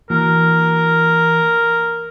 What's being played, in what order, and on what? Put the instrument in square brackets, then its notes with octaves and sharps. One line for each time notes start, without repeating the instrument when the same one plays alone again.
[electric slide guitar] E3 A#3 F#4 [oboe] A#4